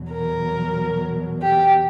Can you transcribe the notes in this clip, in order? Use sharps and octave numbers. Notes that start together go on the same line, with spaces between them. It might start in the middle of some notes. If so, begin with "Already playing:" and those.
Already playing: E2 B2 F#3
A#4
G4